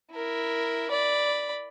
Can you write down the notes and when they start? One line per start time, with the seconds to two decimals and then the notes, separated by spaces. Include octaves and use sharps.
0.12 E4 A#4
0.91 D5 B5